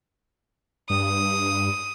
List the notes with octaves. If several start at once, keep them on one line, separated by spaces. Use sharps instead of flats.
G2 D#6